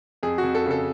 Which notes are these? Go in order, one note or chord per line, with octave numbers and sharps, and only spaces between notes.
F2 G#4
F#4
F2
A4
C#3 A4